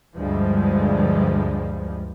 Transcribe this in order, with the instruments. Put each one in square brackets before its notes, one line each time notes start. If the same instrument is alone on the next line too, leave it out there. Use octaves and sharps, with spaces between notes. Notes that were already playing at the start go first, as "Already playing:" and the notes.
[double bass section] D2 G2 F3 G3 G#3